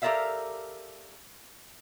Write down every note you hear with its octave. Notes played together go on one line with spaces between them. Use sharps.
G4 A4 A#4 D5 E5 F5